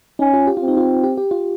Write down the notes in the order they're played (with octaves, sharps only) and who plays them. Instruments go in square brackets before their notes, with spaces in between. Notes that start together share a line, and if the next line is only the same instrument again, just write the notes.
[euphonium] C#4 [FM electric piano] D#4
[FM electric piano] F4
G4
[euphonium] C4 [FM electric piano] F4
[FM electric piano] D#4
F4
G4
G4
F4